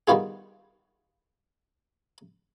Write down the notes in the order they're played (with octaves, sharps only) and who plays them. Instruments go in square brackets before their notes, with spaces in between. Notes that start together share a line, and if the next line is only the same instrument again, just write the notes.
[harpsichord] D#3 G3 B3 F4 G#4